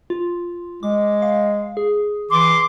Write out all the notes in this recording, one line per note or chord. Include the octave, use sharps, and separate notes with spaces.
F4
G#3 D6
F5
G#4
E3 C6 D6